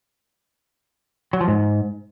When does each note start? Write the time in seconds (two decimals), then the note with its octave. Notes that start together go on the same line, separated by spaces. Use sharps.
1.33 F#3
1.41 F3
1.48 G#2